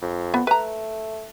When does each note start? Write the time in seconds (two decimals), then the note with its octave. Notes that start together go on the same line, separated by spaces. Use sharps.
0.02 F2
0.34 B3
0.47 A3 B4 A#5